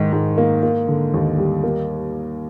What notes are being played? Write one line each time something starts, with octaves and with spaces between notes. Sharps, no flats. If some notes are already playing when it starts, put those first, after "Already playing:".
Already playing: G#2 D#3
G#2
A#3
A#3
D3
D#2
G3
A#3